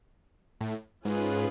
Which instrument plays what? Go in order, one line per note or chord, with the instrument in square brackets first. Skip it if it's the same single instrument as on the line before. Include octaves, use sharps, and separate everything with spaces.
[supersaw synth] A2
[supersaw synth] G#2 [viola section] C#4 F4 G#4 B4